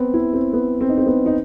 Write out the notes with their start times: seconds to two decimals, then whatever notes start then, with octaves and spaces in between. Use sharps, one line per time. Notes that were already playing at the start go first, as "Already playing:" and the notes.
Already playing: B3 C4
0.14 E4
0.33 C4
0.53 B3
0.81 C4
0.89 D#4
0.98 C4
1.06 B3
1.26 D#4